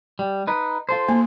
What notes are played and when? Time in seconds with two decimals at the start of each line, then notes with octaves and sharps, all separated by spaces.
0.19 G3
0.47 D#4 B4
0.89 F4 A4 C5
1.08 A#3